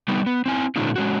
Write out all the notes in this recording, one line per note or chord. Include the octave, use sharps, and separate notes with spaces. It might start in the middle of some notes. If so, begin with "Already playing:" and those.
G3 B3 D#4
B3
C4 E4 G#5
A#2 D3 G#3 C#4 D#4 F4
G#3 C#4 F#4